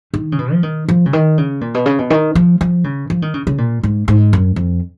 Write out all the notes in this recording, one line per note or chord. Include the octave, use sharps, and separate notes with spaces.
D#3
C#3
B2
F3
D#3
F3
C#3
D#3
C#3
A#2
B2
C#3
B2
D#3
F3
F3
C#3
F3
D#3
C#3
C#3
A#2
G#2
G#2
F#2
F2